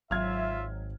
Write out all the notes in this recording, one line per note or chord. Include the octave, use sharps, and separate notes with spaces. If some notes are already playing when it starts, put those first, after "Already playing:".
G#1 F#3 F4 E5 F6 G#6